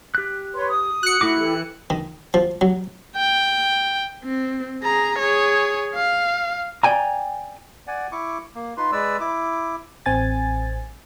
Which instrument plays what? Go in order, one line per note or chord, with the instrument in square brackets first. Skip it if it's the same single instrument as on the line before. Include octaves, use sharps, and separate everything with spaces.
[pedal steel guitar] G4 F#6
[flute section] B4 C#5 C6
D#6
[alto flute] F#4 [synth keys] F#6 C#7
[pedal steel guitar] A3 F#4 D6 [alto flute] E4
[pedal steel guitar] E3 [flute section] G4 A4
[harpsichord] D#3
F3
F#3
[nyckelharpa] G5
[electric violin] C4
G#4 A#5
G#4 C#5
F5
[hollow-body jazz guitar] D5 G5 G#5 A#5
[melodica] D5 F#5 G#5
E4 C#6 D6
A#3
D#4 F4 B4 C6
G#3 B4 D5 E6
E4 D6
[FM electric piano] A1 C4 G#5 A6